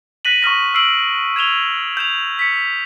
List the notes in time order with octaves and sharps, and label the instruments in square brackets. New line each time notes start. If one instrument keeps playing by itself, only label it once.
[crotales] F#6 A#6 B6 D#7 F#7
C#6 D#6 F6 A#6
E6 F6 C7 D7 F#7
G#6 E7 F7 G7
G6 E7 F7
B6 C#7